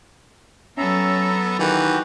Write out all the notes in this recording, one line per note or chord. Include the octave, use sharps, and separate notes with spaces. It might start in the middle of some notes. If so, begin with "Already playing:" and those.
F#3 B3 C#4 A4 E5 A#5
D#3 E3 F#4 G4